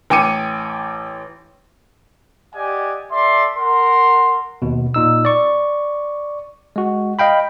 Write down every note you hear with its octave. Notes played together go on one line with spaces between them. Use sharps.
A1 G5 G#5 D6 C#7 D#7
G4 D5 D#5 F#5 G#5
A4 D5 E5 C6
A#4 F#5 C6
D#2 B2
A#2 D#4 E6
D5 C#6
G#3 F#4
D#5 F5 G5 B5